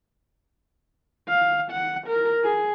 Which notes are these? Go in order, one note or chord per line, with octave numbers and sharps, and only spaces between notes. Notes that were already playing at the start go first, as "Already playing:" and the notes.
F5
F#5
A#4
G#4